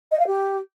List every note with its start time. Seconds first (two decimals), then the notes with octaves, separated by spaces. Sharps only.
0.11 D#5
0.19 F5
0.26 G4